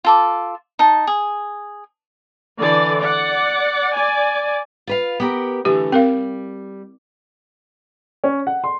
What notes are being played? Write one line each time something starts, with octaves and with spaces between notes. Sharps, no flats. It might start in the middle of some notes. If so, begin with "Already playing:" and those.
F4 A4 D6
D#4 A5
G#4
D3 E3 D5
D5 F#5
D5 G#5
F4 B4 F5
B3 G4 A#4
D3 E3 A3 G4
G3 C4 A#4 F5
C#4
F#5
C6